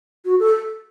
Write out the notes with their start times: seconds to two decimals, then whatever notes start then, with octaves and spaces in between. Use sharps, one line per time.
0.25 F#4
0.40 A4